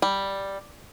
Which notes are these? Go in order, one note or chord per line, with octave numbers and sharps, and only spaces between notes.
G3